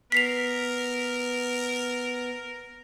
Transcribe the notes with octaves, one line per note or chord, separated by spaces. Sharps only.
B3 A#4 B6 C7 F7